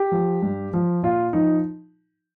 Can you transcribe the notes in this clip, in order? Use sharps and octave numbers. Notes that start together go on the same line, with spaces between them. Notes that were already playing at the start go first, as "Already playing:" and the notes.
Already playing: G4
F3
G2
F3
A#2 F4
F3 D#4